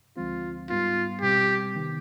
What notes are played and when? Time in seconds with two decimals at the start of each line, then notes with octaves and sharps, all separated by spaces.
0.17 D2 D3 F3 G#3 C4 F4
0.69 G#2 G3 B3 D#4 F4
1.22 B2 G3 C4 G4
1.75 C3 D#3 B3